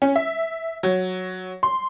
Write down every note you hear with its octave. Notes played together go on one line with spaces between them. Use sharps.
C#4
E5
F#3
C6